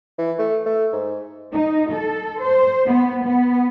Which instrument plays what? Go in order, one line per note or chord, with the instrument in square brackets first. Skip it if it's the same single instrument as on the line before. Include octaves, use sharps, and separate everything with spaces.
[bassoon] E3
A3
A3
G#2
[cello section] D#4
A4
C5
B3
B3